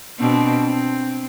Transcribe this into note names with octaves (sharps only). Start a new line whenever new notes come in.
B2 C4 D4
C4